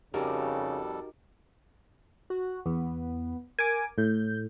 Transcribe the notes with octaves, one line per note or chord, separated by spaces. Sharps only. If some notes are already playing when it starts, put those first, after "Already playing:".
F2 C#3 G3 D#4 F#4 G4 A4 A#4
F#4
E2 B3
A#4 G#5 D6
A2 G6